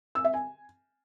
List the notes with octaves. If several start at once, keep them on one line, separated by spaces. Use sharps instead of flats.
E6
E5
G#5